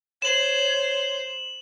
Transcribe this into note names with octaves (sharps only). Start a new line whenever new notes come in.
C5 C#5 E7 F#7